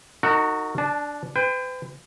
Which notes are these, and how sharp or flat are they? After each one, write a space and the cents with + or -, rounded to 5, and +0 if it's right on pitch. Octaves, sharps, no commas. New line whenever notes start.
D#4 +0 F#4 +0 A#4 -40
D4 +0 A5 -25
B4 +45 G5 +25